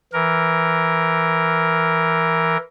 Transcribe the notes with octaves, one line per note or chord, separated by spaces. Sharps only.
E3 A#4